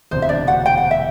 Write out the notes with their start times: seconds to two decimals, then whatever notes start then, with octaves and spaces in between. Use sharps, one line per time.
0.11 E1 D2 C3 C5
0.22 E5
0.29 D4 D5
0.47 F#4 F#5
0.66 G5
0.78 F#5
0.91 E5